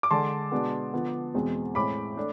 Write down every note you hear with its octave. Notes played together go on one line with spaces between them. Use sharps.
D6
D3 G#3 D4 A5 C6
B2 G#3 B3 D4
D3 F3 B3
E2 B2 G#3 C4
A2 G#3 C4 B5 D6
A3 D4